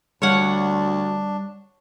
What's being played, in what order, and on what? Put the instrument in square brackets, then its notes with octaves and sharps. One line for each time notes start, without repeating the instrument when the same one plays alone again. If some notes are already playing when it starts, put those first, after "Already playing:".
[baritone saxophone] D2 [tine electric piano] G3 [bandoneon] D4 [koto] C#5 F5 F#5